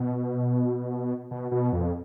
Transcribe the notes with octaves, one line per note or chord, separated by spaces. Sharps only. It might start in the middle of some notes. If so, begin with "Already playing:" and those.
Already playing: B2
B2
B2
F2